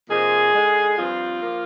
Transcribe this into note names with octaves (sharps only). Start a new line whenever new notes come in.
C3 F3 A#3 D#4 G#4
D3 G#3 D#4
G2 F3 C4 F4
F3 A#3